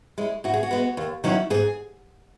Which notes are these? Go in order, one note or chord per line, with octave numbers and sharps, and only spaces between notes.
G#3 C#4 E4
A2 F#4
G#4
F#4
G#3 B3
D#2
D#3 F#3 C#4 E4
G#2 G#4